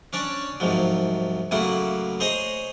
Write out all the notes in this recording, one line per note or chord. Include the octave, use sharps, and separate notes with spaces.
C#4 D4 C#5 D5 C#6
C2 G#2 F3 F#3
A2 C#3 F#3 A#3 E4 F#5
G#4 C5 C#5 D#5 A#5 D#6